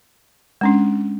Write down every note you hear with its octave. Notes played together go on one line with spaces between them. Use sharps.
G#3 C#4 D4